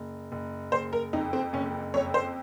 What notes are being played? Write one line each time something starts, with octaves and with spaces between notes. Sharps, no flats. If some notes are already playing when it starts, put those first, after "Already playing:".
Already playing: F#1
F#1
F#1 C5
A#4
F2 D#4
C4
F#1 C#4
F2 C#5
C5